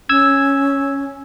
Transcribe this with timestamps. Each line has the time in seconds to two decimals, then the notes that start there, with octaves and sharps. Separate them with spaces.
0.09 C#4 E6 G#6